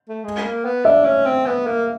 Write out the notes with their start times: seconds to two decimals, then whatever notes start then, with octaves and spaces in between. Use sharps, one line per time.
0.09 A3
0.24 G#3
0.45 A#3
0.65 B3
0.85 D4 E5
1.05 C#4
1.26 C4
1.47 B3
1.67 A#3